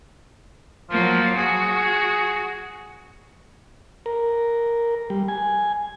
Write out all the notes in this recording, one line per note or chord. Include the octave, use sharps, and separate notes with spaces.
F3 F#3 A#3
F#4 G#4
A#4
G3
G#5